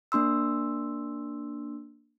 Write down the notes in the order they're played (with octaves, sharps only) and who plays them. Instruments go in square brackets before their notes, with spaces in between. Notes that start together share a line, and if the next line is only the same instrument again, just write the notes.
[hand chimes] A#3 D4 C6 E6